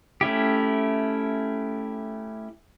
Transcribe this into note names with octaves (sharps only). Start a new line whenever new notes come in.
A3 C#4 E4 G4